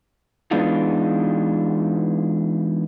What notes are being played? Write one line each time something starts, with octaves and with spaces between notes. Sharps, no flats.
E3 G#3 B3 D4 D#4 F4